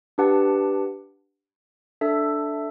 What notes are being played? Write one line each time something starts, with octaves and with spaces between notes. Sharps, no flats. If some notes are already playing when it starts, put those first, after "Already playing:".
D4 G4 B4 F#5 A5
D4 A4 E5